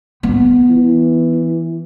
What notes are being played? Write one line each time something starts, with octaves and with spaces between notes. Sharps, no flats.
B3
E3